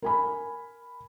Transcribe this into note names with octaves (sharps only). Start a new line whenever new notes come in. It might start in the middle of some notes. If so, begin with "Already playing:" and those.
A#4 G#5 B5